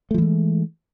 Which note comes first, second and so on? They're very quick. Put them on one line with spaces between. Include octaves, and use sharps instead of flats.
A3 F3 E3 G#3